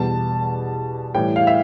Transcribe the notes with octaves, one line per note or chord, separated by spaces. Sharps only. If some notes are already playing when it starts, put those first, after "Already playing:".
Already playing: E2 B2 G3 A5
A2 E3 G3 G5
F5
E5